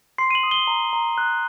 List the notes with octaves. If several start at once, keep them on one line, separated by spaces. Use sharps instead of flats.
C6 C7
D#7
F#7
D#6
G7
A#5
A#5
F#6